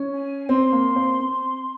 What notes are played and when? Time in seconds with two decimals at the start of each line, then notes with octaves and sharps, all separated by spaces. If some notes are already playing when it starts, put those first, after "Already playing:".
Already playing: C#4
0.13 G#5
0.49 C4 C6
0.72 A#3
0.96 C4
1.20 C4